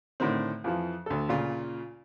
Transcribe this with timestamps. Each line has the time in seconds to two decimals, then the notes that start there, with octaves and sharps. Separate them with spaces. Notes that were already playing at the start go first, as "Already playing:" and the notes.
0.20 A2 D3 D#3 C4
0.64 F2 E3 F3
1.06 D2 A4
1.29 A#2 C#3 F4